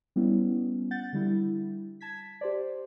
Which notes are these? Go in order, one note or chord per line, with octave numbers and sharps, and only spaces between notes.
G3 B3 C#4 E4
F#5 G6 A6
D3 G3 E4
A5 G#6 B6
G4 C5 D5